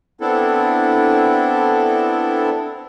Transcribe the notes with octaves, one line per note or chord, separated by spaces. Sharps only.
B3 C4 D4 E4 A4